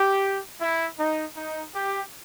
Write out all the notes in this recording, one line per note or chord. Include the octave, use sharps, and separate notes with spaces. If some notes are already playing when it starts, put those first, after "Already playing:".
Already playing: G4
E4
D#4
D#4
G4